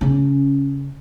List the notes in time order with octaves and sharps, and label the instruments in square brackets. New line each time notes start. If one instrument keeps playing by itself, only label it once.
[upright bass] C#3 C#4